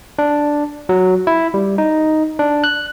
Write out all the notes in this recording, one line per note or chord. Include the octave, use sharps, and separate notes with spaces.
D4
F#3
E4
G3
D#4
D4
F#6